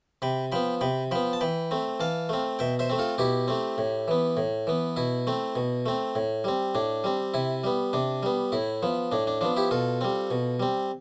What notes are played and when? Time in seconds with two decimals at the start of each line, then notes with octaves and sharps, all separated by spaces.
0.22 C3 G5 B5
0.52 F3 B3 G5 B5
0.81 C3 G5 B5
1.11 F3 B3 G5 B5
1.33 A5
1.41 E3 G5 B5
1.71 A3 C4
2.00 E3 F5 A5
2.29 A3 C4
2.59 B2 E5 G5
2.79 C5 E5
2.90 A3 C4
2.99 F4 A4
3.18 B2 E4 G4
3.48 A3 C4
3.78 A2
4.08 E3 B3
4.37 A2
4.67 E3 B3
4.96 B2 E4
5.27 A3 C4
5.56 B2
5.86 A3 C4
6.15 A2
6.44 G3 C4
6.75 A2 D4
7.04 G3 C4
7.34 C3 E4
7.64 G3 B3
7.93 C3 D4
8.23 G3 B3
8.52 A2 E4
8.83 F3 B3
9.12 A2 D4
9.27 D4
9.41 F3 B3 D4
9.56 E4 G4
9.71 B2 F4 A4
10.01 G3 C4
10.31 B2
10.60 G3 C4